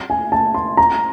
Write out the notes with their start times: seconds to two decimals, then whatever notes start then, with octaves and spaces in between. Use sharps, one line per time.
0.10 G#5
0.32 A5
0.54 C6
0.77 A#5